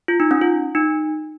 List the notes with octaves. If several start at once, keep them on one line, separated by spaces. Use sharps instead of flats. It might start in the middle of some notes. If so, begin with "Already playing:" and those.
F4
D#4
C#4
F4
D#4